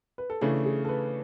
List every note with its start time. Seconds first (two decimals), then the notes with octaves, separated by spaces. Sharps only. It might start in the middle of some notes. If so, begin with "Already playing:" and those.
0.18 B4
0.30 A4
0.41 C#3 E3 A3 D4 G#4
0.65 G#4
0.85 A4
0.89 B4